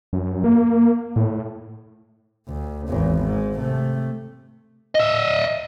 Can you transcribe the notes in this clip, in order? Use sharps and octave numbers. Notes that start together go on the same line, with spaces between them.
F#2
A#3
A2
D2
G#1 E2
G#2
C3 A3
D#5 E5